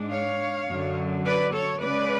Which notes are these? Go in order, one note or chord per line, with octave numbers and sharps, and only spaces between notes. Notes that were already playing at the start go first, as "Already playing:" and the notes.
Already playing: G#2 G#3 D4
C#5 F5
F#2 D3 F#3
B4 D5
A4 C#5
C#3 G#3 C#4 B4 D5